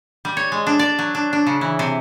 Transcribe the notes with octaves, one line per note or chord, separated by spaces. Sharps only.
G3
C#5
G#3
D4
D5
F#3
D4
D4
C#3
E3
C3